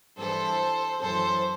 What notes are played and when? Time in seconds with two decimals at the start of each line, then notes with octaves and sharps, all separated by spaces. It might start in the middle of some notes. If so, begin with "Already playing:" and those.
0.18 G2 E3 A4 C5
1.01 F#2 E3 A4 C5